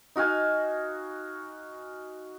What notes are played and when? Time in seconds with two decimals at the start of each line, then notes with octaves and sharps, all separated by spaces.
0.16 D#4 F#4 F5 G#5